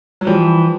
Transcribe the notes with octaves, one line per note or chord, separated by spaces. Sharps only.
F#3
E3 F3 G3